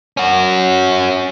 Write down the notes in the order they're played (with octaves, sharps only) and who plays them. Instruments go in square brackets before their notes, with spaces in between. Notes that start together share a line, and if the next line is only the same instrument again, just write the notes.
[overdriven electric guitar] C#4 F#4